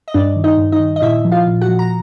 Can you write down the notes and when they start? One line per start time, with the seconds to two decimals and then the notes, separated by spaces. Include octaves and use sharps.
0.08 D#5
0.14 G2 D4 D5
0.36 D#3
0.44 D#4 D#5
0.58 G2
0.72 D#4 D#5
0.80 D#3
0.96 D#5
1.02 A#2 E4 E5
1.25 F3
1.32 F4 F5
1.47 A#2
1.61 F#4 F#5
1.69 F3
1.79 A#5